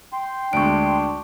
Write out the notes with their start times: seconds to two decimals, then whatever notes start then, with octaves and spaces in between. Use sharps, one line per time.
0.13 G5 C6
0.53 D2 G#3 D4 C#6 D7